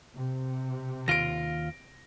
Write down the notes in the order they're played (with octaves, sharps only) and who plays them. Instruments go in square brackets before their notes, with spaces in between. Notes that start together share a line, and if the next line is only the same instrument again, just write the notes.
[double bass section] C3
[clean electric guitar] D#2 F4 [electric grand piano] A#6 D7